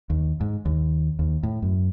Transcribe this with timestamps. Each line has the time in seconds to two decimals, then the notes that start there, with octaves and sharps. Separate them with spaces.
0.10 D#2
0.41 G#2
0.65 D#2
1.19 D#2
1.43 A2
1.62 F#2